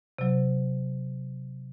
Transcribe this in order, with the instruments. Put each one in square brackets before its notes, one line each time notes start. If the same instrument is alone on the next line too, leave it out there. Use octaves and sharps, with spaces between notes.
[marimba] C3 F#3